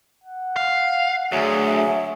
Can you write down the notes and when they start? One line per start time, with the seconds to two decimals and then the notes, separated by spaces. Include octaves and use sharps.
0.24 F#5
0.56 F5
1.32 D2 F#3 G#4 E5